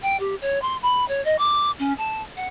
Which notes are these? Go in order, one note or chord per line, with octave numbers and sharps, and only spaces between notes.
G5
G4
C#5
C6
B5
C#5
D#5
D6
C#4
A5
F#5